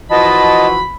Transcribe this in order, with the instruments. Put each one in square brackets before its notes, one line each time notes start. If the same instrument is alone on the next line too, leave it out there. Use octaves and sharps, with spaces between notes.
[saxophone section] E3 F3 F#4 [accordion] D#5 A5 [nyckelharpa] B5